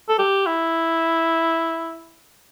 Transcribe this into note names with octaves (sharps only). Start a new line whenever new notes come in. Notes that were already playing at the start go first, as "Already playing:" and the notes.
A4
G4
E4